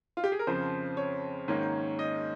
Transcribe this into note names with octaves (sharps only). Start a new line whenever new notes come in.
F4
G4
G#4
A#4
F2 C#3 F3 C4 C5
C#5
G#2 D#3 A#3 C#4
D#5